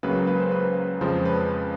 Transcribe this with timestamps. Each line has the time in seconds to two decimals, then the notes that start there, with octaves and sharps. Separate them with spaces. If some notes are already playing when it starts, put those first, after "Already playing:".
0.03 C#2 C#3 F#3 A#3 B4
0.28 B4
0.40 C5
0.52 B4
1.01 F2 C#3 F3 G#3 C5
1.26 B4